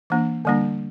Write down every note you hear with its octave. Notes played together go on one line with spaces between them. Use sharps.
E3 A#3 D4
D3 G3 A#3 D4